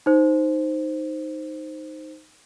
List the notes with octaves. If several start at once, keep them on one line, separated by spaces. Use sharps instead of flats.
D#4 C5